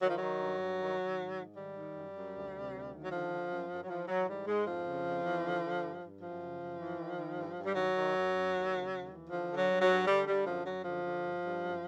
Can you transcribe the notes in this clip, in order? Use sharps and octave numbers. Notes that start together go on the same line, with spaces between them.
D#3 F#3
F3
F#3
D#3
G2
G2
D#3
D#3
G#2
G#2
D#3 G3
D#3
F#2
F#2
D2
C3
D2
D#3
F#3
D3 F3
D3
F#2
F#2
F#3
E3 F3
E3 F#3
G#2 G3
G#2 G#3
F2 F3
C#3
F2
E3
D3
D3
G2
G2
F#2 F3
C#3
F#2
E3
D#3
D#3
G2
G2
G3
D#3 F#3
D#3
F#2
F#2
D#2
C#3
D#2
E3
D3 F3
D3
F#3
G2
F#3
G2
D3 G3
D3 G3
F#2 F3
F#2 F#3
D3 F3
D3
G2
G2
F#2